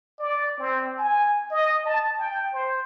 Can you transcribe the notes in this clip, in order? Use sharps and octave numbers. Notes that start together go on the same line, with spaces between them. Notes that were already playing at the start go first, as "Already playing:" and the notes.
D5
C4
G#5
D#5
A5
G5
C5